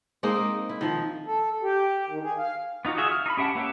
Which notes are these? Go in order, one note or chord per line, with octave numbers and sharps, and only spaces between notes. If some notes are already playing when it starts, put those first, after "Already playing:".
G#3 A#3 C4 D#4
E4
D#3 F3
A4
G4
D#3
G#4
F5
B3 D#4 F4 F#4
F4 F#4 G#4 E5
F6
D#4 B5
C#4 G4 E5 F#5 A5
A#3 C#4 G4 B4 E5